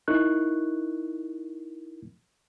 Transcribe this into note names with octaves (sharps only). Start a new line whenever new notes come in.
D#4 E4 A#4 C#6 F#6